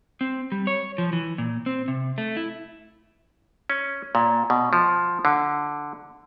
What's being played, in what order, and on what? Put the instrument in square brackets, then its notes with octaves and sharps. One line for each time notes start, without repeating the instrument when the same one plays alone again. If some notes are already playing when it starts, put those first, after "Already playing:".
[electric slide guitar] C4
G3
C#5
F3
E3
A#2
C4
C3
A3
E4
[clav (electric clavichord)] C#4
A#2
B2
F3
D3